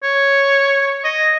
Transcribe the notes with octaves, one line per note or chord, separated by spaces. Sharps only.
C#5
D#5